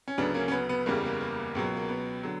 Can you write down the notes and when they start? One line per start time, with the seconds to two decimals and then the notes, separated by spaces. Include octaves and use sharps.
0.08 C#4
0.18 D2 C#3 F#3 B3 D4
0.34 A#3 C#4
0.48 C#4
0.52 B3
0.69 B3
0.86 F#1 E2 C#3 G3 A#3
1.05 A#3
1.21 A#3
1.55 C#2 B2 F#3
1.77 A#3
1.89 B3
2.23 D3 F#3